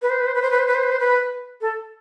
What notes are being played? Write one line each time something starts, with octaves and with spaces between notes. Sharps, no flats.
B4
C5
B4
C5
B4
C5
B4
C5
B4
C5
B4
C5
B4
A4